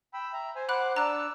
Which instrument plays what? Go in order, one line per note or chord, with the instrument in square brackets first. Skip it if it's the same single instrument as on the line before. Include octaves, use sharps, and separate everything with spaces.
[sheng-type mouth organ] G5 B5 E6
E5 A#5
C5 G#5
[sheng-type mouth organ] C5 F#5 D6 [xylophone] B5 F#6
[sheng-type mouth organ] D4 E6 [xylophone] A#5 F#6